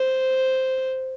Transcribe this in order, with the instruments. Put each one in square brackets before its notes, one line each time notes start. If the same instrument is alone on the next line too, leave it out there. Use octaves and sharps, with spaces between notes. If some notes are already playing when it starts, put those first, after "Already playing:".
Already playing: [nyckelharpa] C5